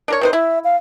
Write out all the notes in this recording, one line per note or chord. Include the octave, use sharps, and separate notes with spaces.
D4 A#4 C#5
C3 D#3 B4 C5
E4 E5
F5